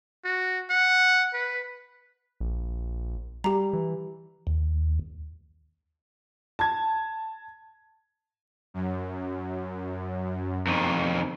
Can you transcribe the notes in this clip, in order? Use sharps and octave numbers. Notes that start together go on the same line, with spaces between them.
F#4
F#5
B4
A#1
G3 G4 A#5
E3
D#2
A5 G#6
F#2
F2 D#3